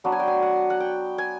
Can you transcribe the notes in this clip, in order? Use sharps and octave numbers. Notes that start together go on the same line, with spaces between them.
F#3 B3 D4 A5
G#5
G5
G#5
F#5
F#5
G5
G#5